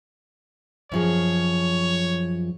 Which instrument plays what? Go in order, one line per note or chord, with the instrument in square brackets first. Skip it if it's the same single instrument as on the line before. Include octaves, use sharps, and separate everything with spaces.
[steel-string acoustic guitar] F#2 F3 G#4 [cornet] C#5